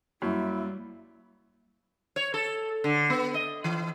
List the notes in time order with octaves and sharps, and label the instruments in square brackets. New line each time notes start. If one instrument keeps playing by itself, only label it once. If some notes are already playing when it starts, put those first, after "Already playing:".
[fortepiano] F#2 [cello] G3 [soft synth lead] A#3 [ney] E4
[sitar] C#5
A4
D3
B3
D#5
E3